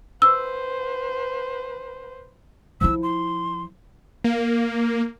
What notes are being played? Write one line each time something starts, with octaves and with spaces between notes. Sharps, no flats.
B4 C5 E6
F3 E4 E6
C6
A#3